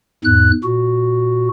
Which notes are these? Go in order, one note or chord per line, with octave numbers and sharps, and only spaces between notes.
E2 G#2 F#6
A#2 F#4